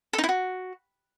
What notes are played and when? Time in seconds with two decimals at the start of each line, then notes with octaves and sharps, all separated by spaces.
0.13 A4
0.18 D#4
0.24 E4
0.29 F#4